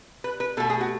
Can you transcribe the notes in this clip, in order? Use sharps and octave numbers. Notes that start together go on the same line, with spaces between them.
B4
B4
B2 A3 A4
G#4
F#4